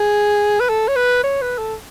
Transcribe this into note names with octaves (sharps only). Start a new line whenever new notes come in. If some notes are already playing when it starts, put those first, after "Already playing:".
Already playing: G#4
B4
A4
C#5
B4
C#5
B4
A4